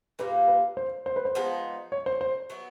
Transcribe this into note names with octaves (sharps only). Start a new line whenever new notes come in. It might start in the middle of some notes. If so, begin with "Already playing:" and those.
A#2 G3 A#3 B4
B4
C5
C5
B4
C5
F3 G#3 B3 D#4
C#5
C5
C5
F#3 B3 E4